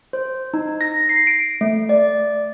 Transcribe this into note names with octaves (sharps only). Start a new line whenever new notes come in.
C5
D#4
A#6
C7
D7
A3
D5